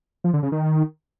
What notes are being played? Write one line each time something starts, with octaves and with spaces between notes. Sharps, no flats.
F3
D3
C#3
D#3